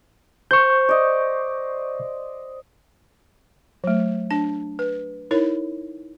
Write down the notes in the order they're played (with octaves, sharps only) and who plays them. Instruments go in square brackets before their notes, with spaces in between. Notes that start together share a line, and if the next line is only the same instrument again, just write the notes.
[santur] C5 [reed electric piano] C#6 G6
[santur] D5 D#5
[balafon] F#3 A3
D4 A5
B4
D#4 E4 A#4 C#5